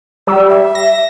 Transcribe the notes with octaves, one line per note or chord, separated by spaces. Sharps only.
G3 E6
E5
A#6